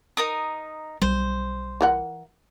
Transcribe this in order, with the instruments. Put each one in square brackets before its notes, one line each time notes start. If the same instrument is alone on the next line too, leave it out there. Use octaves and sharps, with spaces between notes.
[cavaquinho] D#4 A#4 D#6
[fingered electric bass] B1 G3 [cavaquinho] C5
[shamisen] E3 A#4 F#5